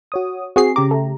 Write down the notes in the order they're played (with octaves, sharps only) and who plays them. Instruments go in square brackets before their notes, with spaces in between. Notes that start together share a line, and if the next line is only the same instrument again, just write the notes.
[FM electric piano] F#4 C#5 D#6
[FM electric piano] C4 [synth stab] F#4 G#4 C7
[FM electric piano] C#3 G4 A#5 [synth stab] D6
[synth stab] A3